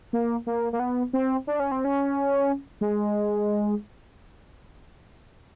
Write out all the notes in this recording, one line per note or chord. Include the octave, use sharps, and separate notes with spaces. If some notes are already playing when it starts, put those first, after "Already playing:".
A#3
A#3
A#3
B3
C4
D4
C#4
C4
C#4
G#3